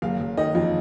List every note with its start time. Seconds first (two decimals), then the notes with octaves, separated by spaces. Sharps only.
0.02 F#1 F5
0.20 F#1
0.37 D#3 D#5
0.55 F2